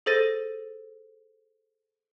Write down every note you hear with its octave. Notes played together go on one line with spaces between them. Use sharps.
G#4 A4 C5 A6 A#6 D#7